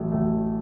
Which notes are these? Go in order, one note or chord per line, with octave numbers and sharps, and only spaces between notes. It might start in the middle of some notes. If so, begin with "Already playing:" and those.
Already playing: A1 A2 F#3 A3
A1 A2 F#3 A3